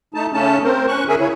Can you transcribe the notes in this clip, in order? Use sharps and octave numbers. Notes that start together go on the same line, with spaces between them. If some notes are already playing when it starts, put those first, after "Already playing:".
A3 D#4 A5
C#3 A3 C#4 A5
C4 A#4 C5
C#4 C#6 F#6
D3 G#4 A#4 E5 G#5
C#3 E4 C#5